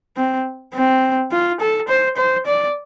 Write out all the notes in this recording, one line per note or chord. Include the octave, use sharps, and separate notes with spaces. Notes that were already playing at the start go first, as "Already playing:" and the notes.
C4
C4
F4
A4
C5
C5
D5